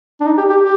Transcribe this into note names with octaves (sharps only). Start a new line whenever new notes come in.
D4
D#4
G4
G4
G4